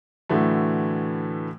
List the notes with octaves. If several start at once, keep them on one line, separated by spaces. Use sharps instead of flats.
A2 D3 E3 F#3 A3